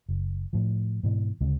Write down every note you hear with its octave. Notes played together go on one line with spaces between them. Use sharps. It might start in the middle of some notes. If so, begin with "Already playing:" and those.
F#1
A2 F3
G#2 B2 E3
D2 C#3 G#3